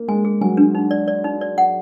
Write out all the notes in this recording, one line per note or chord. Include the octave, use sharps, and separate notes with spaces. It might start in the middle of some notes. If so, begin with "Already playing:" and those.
Already playing: A#3
G#3 G#5
G#4
F#3 G#5
D4
D#4
D5
D5
D#4
D5
F#5